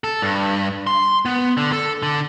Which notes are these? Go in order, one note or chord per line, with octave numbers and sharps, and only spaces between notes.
A4
G2
C6
B3
D3
A4
D3